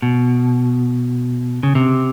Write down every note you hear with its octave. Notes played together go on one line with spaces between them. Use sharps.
B2
C#3
C3